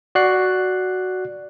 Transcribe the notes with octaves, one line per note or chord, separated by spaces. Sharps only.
F#4 D5 F#6 C7